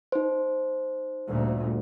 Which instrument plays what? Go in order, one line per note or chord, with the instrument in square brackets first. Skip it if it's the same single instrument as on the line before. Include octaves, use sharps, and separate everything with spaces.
[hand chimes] D#4 C5
[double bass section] G1 D2 A#2